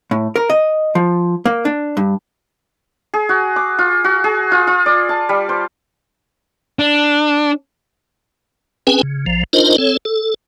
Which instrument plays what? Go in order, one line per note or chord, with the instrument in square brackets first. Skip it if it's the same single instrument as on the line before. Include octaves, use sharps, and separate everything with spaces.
[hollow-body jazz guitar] A2
A#4
D#5
F3
A#3
D4
G2
[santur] G#4
F#4
D6
F4
F#4
G#4
F4
F4
D5
A5
G3
C5
[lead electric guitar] D4
[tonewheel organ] C4 C#4 G#4 B4 G5 G#5
C#3
A#1 F3
D4 D#4 F4 A#4 C5 D#5
C4 A4 C#5
A4